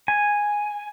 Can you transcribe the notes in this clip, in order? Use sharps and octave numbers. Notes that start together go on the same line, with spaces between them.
G#5